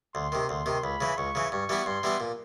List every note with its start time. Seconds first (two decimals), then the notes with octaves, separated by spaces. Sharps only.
0.15 D2 C6
0.32 C3 D#3
0.49 D2 C6
0.66 C3 D#3
0.84 C#2 B5
1.01 C#3 E3
1.17 C#2 C#6
1.35 C#3 E3
1.51 G2 C#6
1.69 E3 G3 B3 E4
1.86 G2 C6
2.03 E3 G3 B3 E4
2.20 A#2